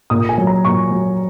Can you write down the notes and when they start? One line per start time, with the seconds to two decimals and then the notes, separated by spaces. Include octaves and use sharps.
0.10 A#2 D#6
0.29 G#5
0.38 F#3
0.47 A#5
0.65 A#2 C#6
0.91 F#3